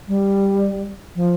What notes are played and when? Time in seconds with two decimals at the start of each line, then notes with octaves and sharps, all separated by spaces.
0.08 G3
1.16 F3